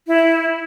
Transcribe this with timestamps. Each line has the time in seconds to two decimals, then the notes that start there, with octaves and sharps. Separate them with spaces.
0.07 E4